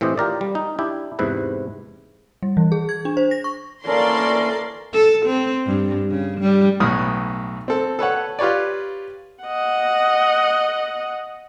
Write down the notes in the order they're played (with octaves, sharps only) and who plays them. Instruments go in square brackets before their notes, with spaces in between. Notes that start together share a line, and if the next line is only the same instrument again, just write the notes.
[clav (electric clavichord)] A2 E3 C4 G4 D#5
F4 G4 A#4 D5
G3
D#4
D4 E4 G4
E2 G#2 C3 E4 B4
[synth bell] G3
E3
G#4
G#6
D4
C5
A#6
C#6
[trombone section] D2 E3 C#4 [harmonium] A#3 A4 [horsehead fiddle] A#4 [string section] D5 C6
[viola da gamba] A4
C4
G2
C#3
G3
[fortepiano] B1 A2 B3 D#6 F6
C4 A4
A4 B4 C#5 F#5
F4 G4 B4 C#5 D5
[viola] D#5 F#5